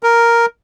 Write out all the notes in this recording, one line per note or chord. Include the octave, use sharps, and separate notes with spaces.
A#4